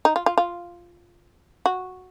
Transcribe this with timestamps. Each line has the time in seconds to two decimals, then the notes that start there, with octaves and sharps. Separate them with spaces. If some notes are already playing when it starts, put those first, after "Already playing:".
0.05 D#4
0.16 F4
0.26 F4
0.38 F4
1.66 F#4